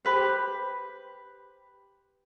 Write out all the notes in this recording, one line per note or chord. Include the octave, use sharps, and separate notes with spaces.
G4 B4 C5